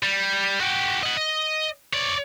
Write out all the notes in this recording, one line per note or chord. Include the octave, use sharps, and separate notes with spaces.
G3
F#4 G4
D#5 F#5
D#5
C#5 D5